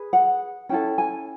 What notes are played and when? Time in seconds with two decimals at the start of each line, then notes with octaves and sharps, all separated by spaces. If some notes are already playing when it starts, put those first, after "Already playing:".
Already playing: G#4 B4
0.13 F#5
0.69 C#4 E4 A4 G5
0.98 G#5